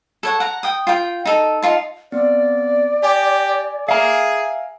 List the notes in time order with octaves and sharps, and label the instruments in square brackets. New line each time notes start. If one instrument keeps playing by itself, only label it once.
[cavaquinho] A4 C#5 F#5
F#5 A#5
G5 D#6
F4 G5
D#4 A4
D#4 F4 A5
[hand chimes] B3 C4 [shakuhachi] D5
[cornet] G4 [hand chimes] G#5 D6
[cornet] G#4 [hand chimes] E5 G#5 [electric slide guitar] F5 A#5